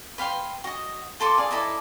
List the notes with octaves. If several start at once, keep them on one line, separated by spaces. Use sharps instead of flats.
B4 F5 G5 C6
F#4 D#5
F4 A4 C6 D6
G#4 D5 F5
D#4 E4 A4 D5